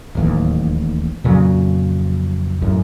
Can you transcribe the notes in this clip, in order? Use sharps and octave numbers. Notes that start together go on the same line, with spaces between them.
D1 A1 D#2
F2 A#2 C#3 F#3
A1 F#2